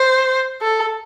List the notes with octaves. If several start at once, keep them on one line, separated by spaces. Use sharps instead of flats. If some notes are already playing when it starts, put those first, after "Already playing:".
Already playing: C5
A4